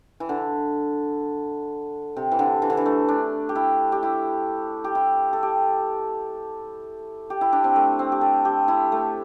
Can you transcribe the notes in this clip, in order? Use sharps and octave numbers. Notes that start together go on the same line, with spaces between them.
E3
D3
C3
E3
D3
E3
D3
E3
A3
D4
G4
E4
G4
E4
G4
E4
A4
G4
G4
E4
D4
C4
A3
C4
G4
A4
G4
E4
A3